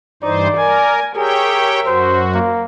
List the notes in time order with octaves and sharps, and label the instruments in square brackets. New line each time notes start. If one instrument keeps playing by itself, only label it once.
[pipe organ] G2 E3 C5 [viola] D#4 [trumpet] D5
[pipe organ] A#4 [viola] G#5
[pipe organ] G4 C#5 G5 [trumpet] G#4 [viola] A#4 E5
[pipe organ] F#2 F#4 [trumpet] C5
[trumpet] A#3